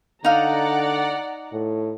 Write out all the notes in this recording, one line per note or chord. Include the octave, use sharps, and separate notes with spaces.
D3 D#4 D5 F5 F#5 A#5
A2